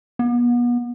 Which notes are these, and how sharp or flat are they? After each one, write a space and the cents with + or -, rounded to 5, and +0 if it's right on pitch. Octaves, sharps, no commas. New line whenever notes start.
B3 -35